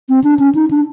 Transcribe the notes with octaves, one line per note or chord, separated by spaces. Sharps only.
C4
D4
C#4
D#4
D4